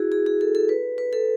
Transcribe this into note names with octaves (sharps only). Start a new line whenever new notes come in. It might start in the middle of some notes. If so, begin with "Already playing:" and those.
Already playing: E4 F#4 G#4
G#4
G#4
A4
A4
B4
B4
A4